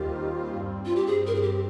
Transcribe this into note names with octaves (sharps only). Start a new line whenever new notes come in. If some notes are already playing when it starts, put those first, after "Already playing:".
Already playing: D#2 D#3 G3 C4 F4 G4
G2 G3 C4
F4
G4
G#4
A#4
G#4
G4